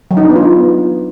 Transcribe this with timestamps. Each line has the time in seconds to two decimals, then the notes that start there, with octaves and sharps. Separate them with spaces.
0.11 F#3
0.17 D#4
0.23 D4
0.29 B3
0.36 F4